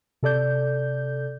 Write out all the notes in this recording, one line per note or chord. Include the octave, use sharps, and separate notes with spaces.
C3 A4 D5 G6